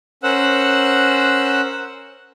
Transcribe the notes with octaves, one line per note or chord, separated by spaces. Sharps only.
C#4 A#4 C5 F#5 E6 F#6